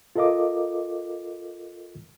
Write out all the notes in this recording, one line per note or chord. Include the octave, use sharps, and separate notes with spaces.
F4 A4 A#4 D#5 F5 D6